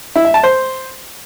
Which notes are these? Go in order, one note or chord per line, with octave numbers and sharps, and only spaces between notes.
E4
E5
A5
C5